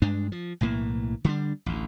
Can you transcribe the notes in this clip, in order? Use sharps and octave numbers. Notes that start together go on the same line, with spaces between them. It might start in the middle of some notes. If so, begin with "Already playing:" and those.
G2 G#3 D4
F3
B1 A2 E3 A#3
D3 G3 D4
A1 D2